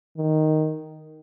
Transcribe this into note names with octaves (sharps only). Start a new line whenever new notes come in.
D#3